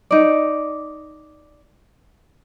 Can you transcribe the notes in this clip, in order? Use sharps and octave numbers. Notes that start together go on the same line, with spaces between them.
D#4 D5